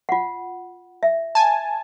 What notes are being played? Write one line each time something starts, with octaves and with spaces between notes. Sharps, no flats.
F4 F#5
E5
G#5 A5